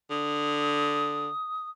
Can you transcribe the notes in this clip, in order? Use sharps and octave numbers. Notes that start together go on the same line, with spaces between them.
D3 D#6